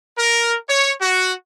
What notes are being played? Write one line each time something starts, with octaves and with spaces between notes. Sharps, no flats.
A#4
C#5
F#4